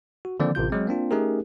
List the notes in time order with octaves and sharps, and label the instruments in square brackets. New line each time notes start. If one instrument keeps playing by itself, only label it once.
[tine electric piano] F#4
D3 D#3 F3 A#3 C4 D5
A1 C3 F4 G6
F#3 G#3 C4
A#3 C4 D4 F4
A3 C#4 D#4 G4 G#4 A#4